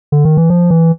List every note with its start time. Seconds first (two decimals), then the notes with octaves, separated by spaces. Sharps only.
0.12 D3
0.25 D#3
0.37 E3
0.50 F3
0.70 E3